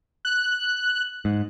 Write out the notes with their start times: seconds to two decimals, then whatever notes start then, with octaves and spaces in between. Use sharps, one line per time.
0.25 F#6
1.25 G#2